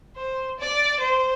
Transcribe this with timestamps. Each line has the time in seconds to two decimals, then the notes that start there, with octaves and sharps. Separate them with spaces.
0.16 C5
0.60 D5
1.00 C5